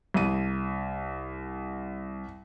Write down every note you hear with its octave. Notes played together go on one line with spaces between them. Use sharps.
C2 D#7